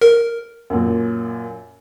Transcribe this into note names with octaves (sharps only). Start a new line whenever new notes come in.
A#4
F#2 A#2